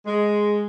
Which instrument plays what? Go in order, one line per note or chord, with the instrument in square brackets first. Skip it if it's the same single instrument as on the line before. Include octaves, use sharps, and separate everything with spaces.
[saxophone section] G#3